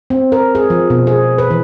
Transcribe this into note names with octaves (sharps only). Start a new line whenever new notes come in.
C4
A#4
G#4
F3
B2
G#4
B4
E3